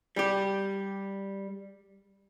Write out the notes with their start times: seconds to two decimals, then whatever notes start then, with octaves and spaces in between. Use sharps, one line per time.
0.16 G3 G4